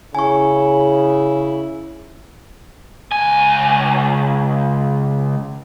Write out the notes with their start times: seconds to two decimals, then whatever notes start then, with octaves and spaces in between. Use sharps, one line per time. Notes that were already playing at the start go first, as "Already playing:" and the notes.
0.15 C#3 E4 G#5 C#6
3.12 C#2 G#5